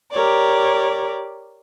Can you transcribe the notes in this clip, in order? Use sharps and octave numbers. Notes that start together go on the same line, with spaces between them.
G4 A#4 C#5 D5